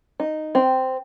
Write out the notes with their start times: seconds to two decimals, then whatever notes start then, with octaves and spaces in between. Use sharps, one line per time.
0.20 D#4
0.55 C4